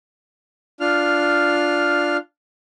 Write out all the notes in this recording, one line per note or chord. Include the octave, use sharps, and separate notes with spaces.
D4 F4 F6